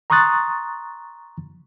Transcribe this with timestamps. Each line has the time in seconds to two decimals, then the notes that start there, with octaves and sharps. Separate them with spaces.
0.10 A#5 C6 C#6 D#6 F#6 A6